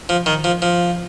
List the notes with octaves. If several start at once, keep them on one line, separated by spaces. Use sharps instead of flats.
F3
D#3
F3
F3